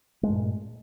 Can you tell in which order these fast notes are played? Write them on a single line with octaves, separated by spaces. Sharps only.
G#3 A3 G2 A#2